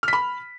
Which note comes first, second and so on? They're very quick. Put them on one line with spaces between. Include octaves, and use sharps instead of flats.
F6 B6 B5